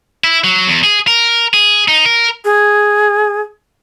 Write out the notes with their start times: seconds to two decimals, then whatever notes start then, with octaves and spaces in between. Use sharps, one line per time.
0.24 E4
0.44 F#3
0.67 E2
0.84 G#4
1.07 A#4
1.54 G#4
1.88 D#4
2.05 A#4
2.45 G#4